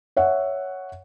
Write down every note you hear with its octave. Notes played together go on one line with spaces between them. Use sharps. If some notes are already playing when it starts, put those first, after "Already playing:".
C#5 E5 F#5